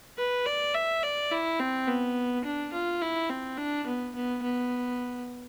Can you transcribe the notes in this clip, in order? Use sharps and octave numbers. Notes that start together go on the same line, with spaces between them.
B4
D5
E5
D5
E4
C4
B3
D4
F4
E4
C4
D4
B3
B3
B3